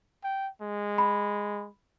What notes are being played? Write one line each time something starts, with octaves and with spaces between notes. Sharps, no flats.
G5
G#3
B5